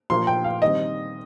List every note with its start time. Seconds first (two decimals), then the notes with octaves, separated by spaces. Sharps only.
0.10 A#2 F3 A#3 C6
0.27 G5
0.44 F5
0.62 D#3 G3 C4 D#5